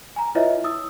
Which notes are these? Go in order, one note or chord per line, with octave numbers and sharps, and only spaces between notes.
G#5 A#5
E4 F4 B4 C#5 D#5 E5
E4 D#6 E6